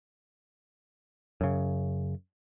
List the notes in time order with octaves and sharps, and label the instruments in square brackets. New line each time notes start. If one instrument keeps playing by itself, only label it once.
[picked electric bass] F#2 C#3